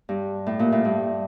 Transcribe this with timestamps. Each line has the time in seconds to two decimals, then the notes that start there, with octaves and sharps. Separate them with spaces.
0.09 G2
0.47 A2
0.59 A#2
0.72 A2
0.85 G2